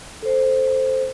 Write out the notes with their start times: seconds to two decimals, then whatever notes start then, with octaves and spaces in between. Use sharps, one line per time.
0.22 A4 C5